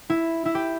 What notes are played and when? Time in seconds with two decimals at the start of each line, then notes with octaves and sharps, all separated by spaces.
0.10 E4
0.45 E4
0.55 G4